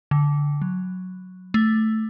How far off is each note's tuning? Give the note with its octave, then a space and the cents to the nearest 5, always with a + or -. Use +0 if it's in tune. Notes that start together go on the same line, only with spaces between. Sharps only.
D3 -15
F#3 -5
A3 +0